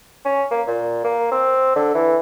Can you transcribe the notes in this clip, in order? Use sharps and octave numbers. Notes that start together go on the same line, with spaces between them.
C#4
A#3
A#2
A#3
C4
D3
E3